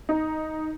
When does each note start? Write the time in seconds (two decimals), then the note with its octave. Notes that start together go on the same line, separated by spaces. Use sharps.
0.09 D#4